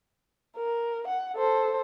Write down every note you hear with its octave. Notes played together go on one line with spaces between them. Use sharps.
A#4
F#5
A4 C5